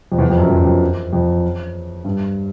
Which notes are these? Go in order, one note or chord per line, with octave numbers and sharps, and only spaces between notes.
F2
E2
F2
F#2
F2
F#2
F2
F2
G2